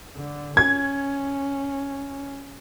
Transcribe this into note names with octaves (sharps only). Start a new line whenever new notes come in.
D3
C#4 G#6